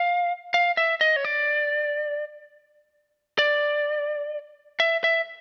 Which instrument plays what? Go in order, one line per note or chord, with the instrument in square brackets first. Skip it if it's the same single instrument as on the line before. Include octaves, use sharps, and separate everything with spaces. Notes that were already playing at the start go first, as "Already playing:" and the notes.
Already playing: [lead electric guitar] F5
F5
E5
D#5
C#5
D5
D5
E5
E5